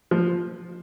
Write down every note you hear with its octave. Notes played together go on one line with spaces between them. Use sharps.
F3